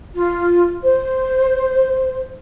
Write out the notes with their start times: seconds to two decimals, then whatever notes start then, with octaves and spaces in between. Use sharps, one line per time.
0.14 F4
0.82 C5